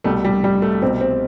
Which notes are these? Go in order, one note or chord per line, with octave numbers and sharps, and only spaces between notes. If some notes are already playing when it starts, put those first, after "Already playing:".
C2 B2 G3 A3
G3
G3
A3
C2 B2 G3 C4
C4